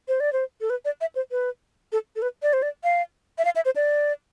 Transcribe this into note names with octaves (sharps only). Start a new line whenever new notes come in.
C5
D5
C5
A4
B4
D5
E5
C5
B4
A4
A4
B4
D5
C5
D5
F5
E5
F5
E5
C5
D5